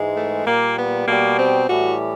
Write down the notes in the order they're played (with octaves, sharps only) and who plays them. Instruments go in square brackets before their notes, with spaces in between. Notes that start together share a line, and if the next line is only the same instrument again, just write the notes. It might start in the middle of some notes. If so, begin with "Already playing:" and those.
Already playing: [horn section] G#2 E3 G#3
A3
A#2 G3 A#3
B3
B2 G3 A#3
C4
A2 E3 G3 F#4